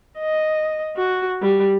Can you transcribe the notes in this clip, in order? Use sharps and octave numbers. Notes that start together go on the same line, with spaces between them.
D#5
F#4
G3